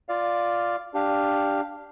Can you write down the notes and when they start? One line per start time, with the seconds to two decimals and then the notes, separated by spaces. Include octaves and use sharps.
0.09 F4 D5 F5
0.94 D4 G4 F5